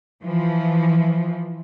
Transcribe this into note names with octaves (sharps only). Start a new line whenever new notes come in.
E3 F3